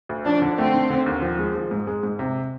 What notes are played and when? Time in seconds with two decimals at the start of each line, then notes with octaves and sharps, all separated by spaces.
0.09 D2
0.25 F3 D4
0.42 D3
0.58 A3 C4
0.74 D3
0.90 D3
1.06 D#2
1.22 F3
1.39 G#3
1.55 F3
1.71 G#2
1.87 G#3
2.03 G#2
2.19 C3